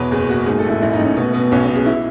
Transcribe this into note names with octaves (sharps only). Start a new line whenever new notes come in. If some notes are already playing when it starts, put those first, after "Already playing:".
Already playing: E2 B2 B4 C#5
F#1 G#4
F#1 F#4
G#2 G#4
A4
A1 E4
A1 E4
D#4
A1
C#4
B2 B3
B2 B3
B1 C#4
C#4
B2
G#4
E4